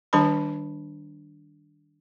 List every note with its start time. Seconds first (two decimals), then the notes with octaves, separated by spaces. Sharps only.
0.13 D#3 G3 D4 B4 A5 B5